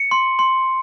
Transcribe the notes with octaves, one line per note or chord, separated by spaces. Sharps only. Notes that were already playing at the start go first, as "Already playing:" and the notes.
Already playing: C#7
C6
C6